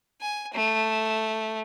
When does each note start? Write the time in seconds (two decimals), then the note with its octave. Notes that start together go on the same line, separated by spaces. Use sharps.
0.21 G#5
0.53 A3